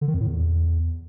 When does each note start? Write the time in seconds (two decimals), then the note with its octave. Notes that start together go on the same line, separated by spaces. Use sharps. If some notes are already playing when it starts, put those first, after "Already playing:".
0.01 D3
0.08 D#3
0.14 F2
0.20 A2
0.27 E2